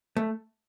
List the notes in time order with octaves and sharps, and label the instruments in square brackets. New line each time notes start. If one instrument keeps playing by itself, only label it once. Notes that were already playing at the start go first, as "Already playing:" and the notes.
[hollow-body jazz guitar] A3